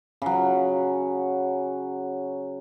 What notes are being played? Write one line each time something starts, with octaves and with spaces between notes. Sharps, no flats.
C#3 F#3